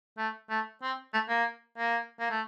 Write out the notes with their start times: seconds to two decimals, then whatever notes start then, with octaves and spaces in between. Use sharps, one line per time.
0.18 A3
0.50 A3
0.82 C4
1.14 A3
1.29 A#3
1.78 A#3
2.20 A#3
2.30 A3